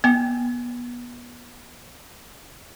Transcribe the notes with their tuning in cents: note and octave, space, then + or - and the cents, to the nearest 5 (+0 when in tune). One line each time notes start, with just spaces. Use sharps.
B3 -30 G5 +0